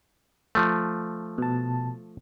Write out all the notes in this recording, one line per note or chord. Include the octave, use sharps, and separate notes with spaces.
F3 A3
B2 A5